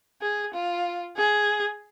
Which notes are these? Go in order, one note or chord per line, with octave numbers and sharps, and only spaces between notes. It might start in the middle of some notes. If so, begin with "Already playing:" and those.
G#4
F4
G#4